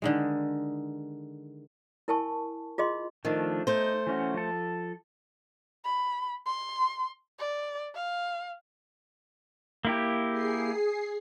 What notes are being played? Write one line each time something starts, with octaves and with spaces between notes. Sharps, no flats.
D3 D#3 G#3
E4 A#4 G#5 A5 C#6
F4 G#4 D#5 C6
D#3 F3 A3 D4
A3 D#4 C5
E3 C#4 F#4
F3 A4
B5
C6
D5
F5
A#3 E4 G4
G#4 C7